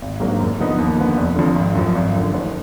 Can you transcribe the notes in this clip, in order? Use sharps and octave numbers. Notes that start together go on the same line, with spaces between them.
G#1
G#2 F#3 A#3 D4
F#2
D3 F3 B3 D#4
D#2
D3 F3 B3
F1
F2 D3
G#1
F#2 F3
G#1
F#2 D3
F#1